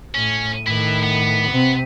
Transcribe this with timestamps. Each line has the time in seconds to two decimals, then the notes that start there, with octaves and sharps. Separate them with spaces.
0.15 A2 C#4
0.66 A2 D#3 E4 B4
1.03 B3
1.50 C3 C4